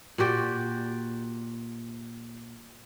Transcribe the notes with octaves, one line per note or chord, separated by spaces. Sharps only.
A#2 F#4 G4 D5